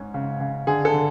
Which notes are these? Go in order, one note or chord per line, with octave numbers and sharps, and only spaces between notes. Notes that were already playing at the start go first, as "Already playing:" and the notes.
Already playing: G#2 C#4
C#3
C#3
D3 G#4
A4
D3